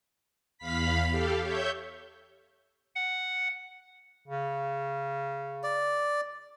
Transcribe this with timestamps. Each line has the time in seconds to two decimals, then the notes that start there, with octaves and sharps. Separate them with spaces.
0.58 E2 F5 B5 B6
1.09 G4 A4 F5
1.42 C#5 E5 G6
2.95 F#5
4.28 C#3
5.63 D5